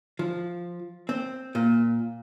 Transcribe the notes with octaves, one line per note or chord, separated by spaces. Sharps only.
F3
C4
A#2